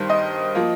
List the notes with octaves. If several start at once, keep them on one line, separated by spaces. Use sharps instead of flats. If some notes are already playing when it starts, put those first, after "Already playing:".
Already playing: G2 D#3 G3 C5
D#5
F3 A#3